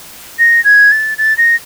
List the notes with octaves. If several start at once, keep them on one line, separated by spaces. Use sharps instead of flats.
A#6
G#6
A6
A6
A#6